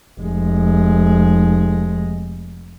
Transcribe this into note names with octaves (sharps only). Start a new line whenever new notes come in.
F1 G#3